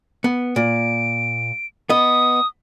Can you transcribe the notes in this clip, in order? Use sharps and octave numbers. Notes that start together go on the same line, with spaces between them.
B3
A#2 D7
B3 D#5 D#6